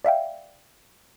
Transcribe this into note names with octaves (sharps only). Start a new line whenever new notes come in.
D5 E5 F5 G5